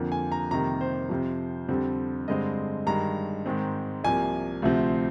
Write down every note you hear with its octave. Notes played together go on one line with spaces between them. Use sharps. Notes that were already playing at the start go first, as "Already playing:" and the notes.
Already playing: F2 D3 F3 A#3
G#5
A#5
F2 C3 D#3 G3 A#3 A#5
C5
F2 C3 F3
F2 D3 G3 C4
G2 D3 G#3 C4 D#5
G2 D#3 G#3 A#5
G#2 D#3 G#3 C4
C2 C3 F3 A#3 G#5
D2 C3 F3 C4